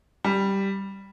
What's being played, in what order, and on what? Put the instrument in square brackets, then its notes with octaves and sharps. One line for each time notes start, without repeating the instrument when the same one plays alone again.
[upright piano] G3